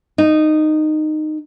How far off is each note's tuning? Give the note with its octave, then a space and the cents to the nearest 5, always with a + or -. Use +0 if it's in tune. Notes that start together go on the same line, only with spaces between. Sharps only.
D#4 -15